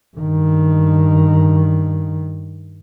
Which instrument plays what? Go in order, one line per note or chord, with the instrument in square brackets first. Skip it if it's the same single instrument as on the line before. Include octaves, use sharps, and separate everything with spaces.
[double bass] G2 D#3